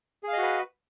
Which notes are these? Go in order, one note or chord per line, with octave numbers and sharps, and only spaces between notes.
F#4 G#4 B4 D#5 F5